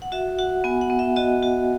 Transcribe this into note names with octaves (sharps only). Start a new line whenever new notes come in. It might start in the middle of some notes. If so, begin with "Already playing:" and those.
F#5
F#4 E5
F#4 F#5
B3 G#5
F#5
B3
E5
F#4 D#5
F#4